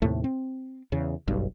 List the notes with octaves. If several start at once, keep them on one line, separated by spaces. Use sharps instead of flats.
D#2 A2 C3 A3
C4
E2 C#3
F#1 B1 G2